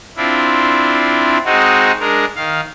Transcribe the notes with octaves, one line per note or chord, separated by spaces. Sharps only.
C4 D4 E4 F4
G#3 C4 D#4 F#4
G#3 D4 A#4
D#3 F5